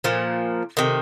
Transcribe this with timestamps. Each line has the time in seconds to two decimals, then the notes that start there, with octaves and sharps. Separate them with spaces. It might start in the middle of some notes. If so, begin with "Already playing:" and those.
0.04 A#2 F3
0.77 C3 D#3